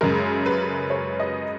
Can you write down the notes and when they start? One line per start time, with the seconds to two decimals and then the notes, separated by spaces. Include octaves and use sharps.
0.01 F#2 C#3 G#3 A#4
0.46 B4
0.90 C#5
1.20 D#5